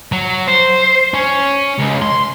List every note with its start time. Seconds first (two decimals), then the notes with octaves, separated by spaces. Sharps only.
0.12 F#3
0.47 C5
1.14 C#4
1.79 C#2
2.02 C6